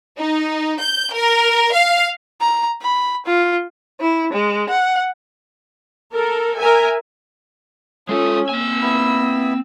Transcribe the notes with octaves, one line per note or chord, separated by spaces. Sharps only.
D#4
G6
A#4
F5
A#5
B5
F4
E4
G#3
F#5
A4 A#4
A#4 E5 G#5
G#3 C#4 F4 A4 D#6
A#3 C4 G#5 E6
B3 E4 B5